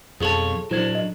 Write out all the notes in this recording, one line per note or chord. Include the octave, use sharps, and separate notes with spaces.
B1 F2 F4 G#4 A4 C#5 A5
A#2 F#3 D4 E4 C5 G#6
D#5